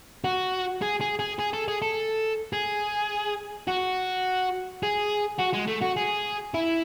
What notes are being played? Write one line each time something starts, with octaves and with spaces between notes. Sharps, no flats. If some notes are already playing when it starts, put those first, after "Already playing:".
F#4
G#4
G#4
G#4
G#4
A4
G#4
A4
G#4
F#4
G#4
F#4
G#3
A3
F#4
G#4
E4